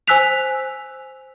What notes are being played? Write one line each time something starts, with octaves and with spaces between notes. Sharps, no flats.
C5 G#5 E6 F#6 B6 F7